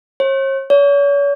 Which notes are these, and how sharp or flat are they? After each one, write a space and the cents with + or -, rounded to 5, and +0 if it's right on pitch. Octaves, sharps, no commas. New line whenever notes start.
C#5 -45
C#5 +40